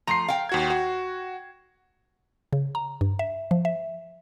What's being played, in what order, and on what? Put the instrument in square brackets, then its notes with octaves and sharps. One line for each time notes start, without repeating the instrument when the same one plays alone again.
[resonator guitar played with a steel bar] F3 A3 [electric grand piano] A#5 C7
[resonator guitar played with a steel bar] F5 G5
[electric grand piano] D#2 F#4 G#6
F#4
[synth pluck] C#3
A#5
G2
E5
F3
E5